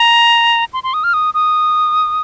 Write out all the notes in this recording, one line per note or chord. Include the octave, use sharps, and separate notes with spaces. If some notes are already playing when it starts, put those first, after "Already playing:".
Already playing: A#5
C6
C6
D#6
F6
D#6
D#6